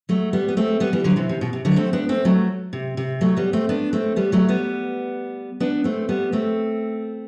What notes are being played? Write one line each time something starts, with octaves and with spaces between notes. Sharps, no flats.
F#3 A3
G3 B3
B3
A3 C4
G3 B3
E3 G3
D3 F#3
C3 E3
C3
B2
C3
D3 F#3
A3 C4
B3 D4
A3 C4
F#3 A3
C3
C3
F#3 A3
G3 B3
A3 C4
B3 D4
A3 C4
G3 B3
F#3 A3
G3 B3
B3 D4
A3 C4
G3 B3
A3 C4